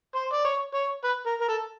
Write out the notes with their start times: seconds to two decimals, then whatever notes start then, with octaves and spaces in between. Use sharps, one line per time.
0.15 C5
0.33 D5
0.45 C#5
0.74 C#5
1.04 B4
1.26 A#4
1.41 A#4
1.48 A4